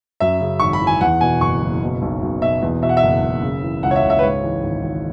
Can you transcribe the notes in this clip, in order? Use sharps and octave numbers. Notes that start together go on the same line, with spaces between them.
F#2 E5
C#3
G#1 C#6
B5
E3
G#5
E2 F#5
B2 G#5
F#1 C#6
F#1
B2
B1
B1
B2 E5
E2
B2 E5
F#5
E5
F#1
F#1
C#3
E3
C#2 F#5
C#5
E5
C#2
E5
B4
G#2 C#5
E3
G#1
G#1